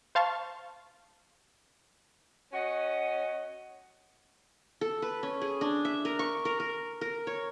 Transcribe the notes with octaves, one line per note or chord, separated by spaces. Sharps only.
C5 F5 A5 C6 C#6
C#4 F#4 D#5 F#5
A4
B4
C#4
G#4
D4
E5
A#4
C#6
A#4
A#4
A#4
C#5